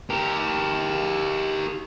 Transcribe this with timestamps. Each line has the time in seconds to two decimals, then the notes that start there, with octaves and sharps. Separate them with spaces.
0.10 G4 A#4